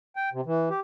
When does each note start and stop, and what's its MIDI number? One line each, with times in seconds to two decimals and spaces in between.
0.16 0.29 79
0.33 0.41 48
0.46 0.69 52
0.70 0.80 67